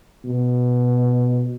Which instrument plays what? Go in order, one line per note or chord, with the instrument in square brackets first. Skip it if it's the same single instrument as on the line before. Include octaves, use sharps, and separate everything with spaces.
[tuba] B2